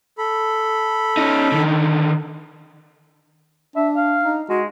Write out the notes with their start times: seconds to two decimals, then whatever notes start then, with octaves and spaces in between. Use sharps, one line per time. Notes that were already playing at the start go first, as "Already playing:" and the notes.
0.18 A4 B5
1.17 C#4 D#4
1.52 D3 D#3
3.76 D4 E5
3.96 F5
4.23 D#4
4.49 G#3 F#4